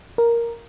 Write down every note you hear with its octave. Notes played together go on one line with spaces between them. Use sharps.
A#4